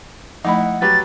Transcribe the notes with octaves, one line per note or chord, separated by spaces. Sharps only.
F3 A3 D#4 E4 F#5 B5
F#3 G4 B4 A6